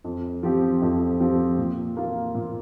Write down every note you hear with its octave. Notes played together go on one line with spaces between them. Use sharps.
F2
F3 C4 G4
F2
F3 C4 G4
A#2
A#3 F4
A#2